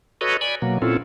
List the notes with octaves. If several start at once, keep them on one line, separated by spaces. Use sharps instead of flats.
F#4 A4 B4 C#5 D#5
D5 G#5 B5
B2 F#3 A#3
A#2 C4 C#4 E4 F4 A4